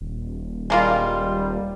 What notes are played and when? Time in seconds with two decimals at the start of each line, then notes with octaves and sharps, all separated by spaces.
0.01 D#1
0.70 G3 G#3 A#3 F4